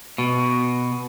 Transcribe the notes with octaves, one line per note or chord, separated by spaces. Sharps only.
B2